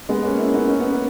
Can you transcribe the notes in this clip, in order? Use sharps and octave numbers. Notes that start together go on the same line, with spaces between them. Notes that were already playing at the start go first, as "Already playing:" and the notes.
G#3 B3
A#3 C#4
C#4 E4
B3 D#4
C#4
B3
A#3